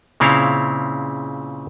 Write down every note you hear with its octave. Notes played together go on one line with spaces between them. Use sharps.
A#2 C#3 C4 E4 C#5 F5